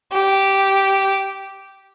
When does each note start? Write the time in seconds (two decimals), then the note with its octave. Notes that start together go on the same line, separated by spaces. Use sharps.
0.13 G4